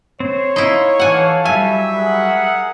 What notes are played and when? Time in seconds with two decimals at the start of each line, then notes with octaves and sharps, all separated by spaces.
0.20 C4 C5 C#5
0.56 D#4 E4 F5 C6
1.00 E3 A4 F5 F#5 G#5
1.45 F#3 G3 E5 G#5
1.96 G#4 A#4 F#5